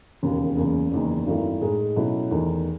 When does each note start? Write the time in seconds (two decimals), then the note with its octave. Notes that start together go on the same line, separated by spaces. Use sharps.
0.23 E1 D#2 C#3
0.57 F#1 E2 C#3
0.92 F#1 E2 D#3
1.27 G#1 F#2 D#3 A3 E4
1.61 A2 G#3 D#4 G#4
1.96 B2 F#3 A3 C#4 E4
2.31 E2 D#3 A3